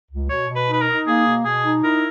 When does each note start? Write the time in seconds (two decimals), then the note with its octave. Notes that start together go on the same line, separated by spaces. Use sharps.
0.10 C#2
0.29 B2 C#5
0.49 B2
0.56 B4
0.68 D#4 B4
0.81 A#4
0.87 D#4
1.07 A#3 G#4
1.26 B2
1.45 B2 G#4
1.64 D#4
1.84 E4 A#4